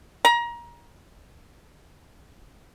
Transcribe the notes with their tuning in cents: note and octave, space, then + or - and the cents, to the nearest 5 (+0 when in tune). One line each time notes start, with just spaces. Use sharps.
A#5 +25